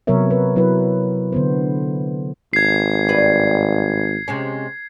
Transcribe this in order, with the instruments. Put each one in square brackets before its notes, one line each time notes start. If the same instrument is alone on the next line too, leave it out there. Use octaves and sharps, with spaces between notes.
[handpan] C3 F#3 B3 A#4 C#5 E5
B4
F#3 E4 B4
D3 B3 C5
[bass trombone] G#1 [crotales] G#6 C7
[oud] G2 G3 B4
C3 G#3 C#4